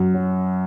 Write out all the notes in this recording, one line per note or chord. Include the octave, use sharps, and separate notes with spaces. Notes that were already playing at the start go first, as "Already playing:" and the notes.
Already playing: F#2
F#3